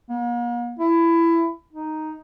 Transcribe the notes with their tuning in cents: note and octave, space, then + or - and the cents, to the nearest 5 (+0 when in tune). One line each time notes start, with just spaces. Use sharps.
A#3 +45
E4 +20
D#4 +0